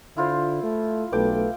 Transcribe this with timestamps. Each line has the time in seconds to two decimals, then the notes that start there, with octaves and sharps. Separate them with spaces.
0.17 D3 E4 F4 C5
0.63 A3
1.13 B1 A3 A4 B4 G5 D6